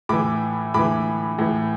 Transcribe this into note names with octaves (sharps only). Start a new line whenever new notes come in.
A2 E3 B5 D6
A2 E3 B5 D6
A2 E3